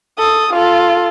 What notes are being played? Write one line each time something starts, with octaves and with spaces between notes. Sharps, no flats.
A4 D#6
F4 A4